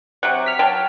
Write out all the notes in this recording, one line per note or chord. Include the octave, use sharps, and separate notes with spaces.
C3 F#3 F#5
F6 B6
F#3 G5 A5